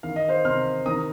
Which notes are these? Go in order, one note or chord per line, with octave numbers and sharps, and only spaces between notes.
D#3 F5
D#5
C5 F5
C3 C6 F6
D#3 A#5 D#6